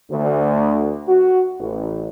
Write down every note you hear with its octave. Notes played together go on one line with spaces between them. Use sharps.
D2
F#4
A1